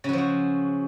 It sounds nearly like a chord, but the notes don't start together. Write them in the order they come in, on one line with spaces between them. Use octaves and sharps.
C#3 F#3 F3 F#4